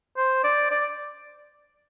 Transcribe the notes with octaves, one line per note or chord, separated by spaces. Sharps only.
C5
D5
D5